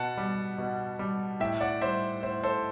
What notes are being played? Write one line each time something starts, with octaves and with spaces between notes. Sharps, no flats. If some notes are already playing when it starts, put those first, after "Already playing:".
Already playing: B2 F#5 A5
G3
B2
G3
A2 E5 G5
D5 F#5
G3 C5 E5
A2 C5 E5
A4 C5